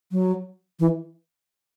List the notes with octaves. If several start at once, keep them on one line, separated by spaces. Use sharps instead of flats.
F#3
E3